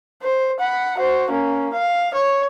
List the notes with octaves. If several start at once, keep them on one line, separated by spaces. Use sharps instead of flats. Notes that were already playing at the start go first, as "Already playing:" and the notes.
C5
F#5 B5
F#4 C5
A#3 C#4
F5
C#5